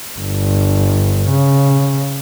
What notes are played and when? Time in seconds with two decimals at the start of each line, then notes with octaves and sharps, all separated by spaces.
0.17 G1
1.29 C#3